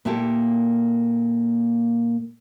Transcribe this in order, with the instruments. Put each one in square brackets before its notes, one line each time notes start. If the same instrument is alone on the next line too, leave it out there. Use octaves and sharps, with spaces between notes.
[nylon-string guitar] A#2 A#3 E4 G4 A4